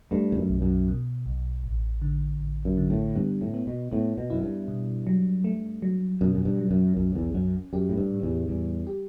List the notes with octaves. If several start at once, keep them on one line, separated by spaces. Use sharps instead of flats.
G2 A3
E2
F#2
B1
F#2
B2
B1
A1
D3
A1
F#2
D3
A2
G2 B3
A2
B3
B2
A2 B3
B2
F#2 E4
G2
B2
F#3
A3
F#3
F#2 B2
F#2
G2
F#3
F#2
B1 F#2
E2
F#2 C#4
F#2 G4
A2
G2
A2
E2
E2 G3
G4